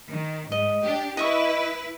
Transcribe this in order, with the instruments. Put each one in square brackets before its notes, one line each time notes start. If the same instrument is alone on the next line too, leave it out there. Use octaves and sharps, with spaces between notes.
[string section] D#3
[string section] G#2 [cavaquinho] D#5
[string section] D4 G4
[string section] E4 B4 [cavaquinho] D#5 E5 C#6